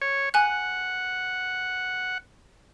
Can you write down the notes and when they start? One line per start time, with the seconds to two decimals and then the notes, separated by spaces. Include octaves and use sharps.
0.02 C#5
0.34 F#5 G#5 F#6